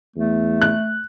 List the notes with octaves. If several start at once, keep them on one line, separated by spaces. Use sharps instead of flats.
E2 A3
F#6